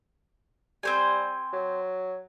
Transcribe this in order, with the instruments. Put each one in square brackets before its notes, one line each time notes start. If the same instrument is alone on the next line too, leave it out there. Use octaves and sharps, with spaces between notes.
[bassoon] G3 [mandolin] C4 C5 G#5
[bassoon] F#3